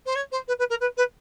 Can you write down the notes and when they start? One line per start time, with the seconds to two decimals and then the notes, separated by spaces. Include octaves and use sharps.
0.06 C5
0.15 C#5
0.31 C5
0.48 B4
0.59 B4
0.70 A#4
0.80 B4
0.97 B4